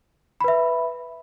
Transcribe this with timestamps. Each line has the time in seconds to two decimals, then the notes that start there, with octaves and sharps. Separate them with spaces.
0.41 B5
0.44 B4
0.48 E5